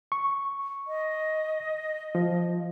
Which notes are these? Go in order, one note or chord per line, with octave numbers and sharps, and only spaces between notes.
C#6
D#5
F3